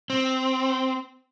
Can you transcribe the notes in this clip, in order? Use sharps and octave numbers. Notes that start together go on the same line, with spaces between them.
C4